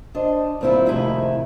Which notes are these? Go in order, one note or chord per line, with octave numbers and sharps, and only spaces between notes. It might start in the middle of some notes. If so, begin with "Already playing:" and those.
D4 C5 D#5
G2 D#3 C4 D4 E4 F4
F2 A2 C3 D#3 E4 G#4